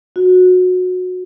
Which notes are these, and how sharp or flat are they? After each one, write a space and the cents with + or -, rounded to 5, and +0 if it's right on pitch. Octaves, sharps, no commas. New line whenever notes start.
F#4 -20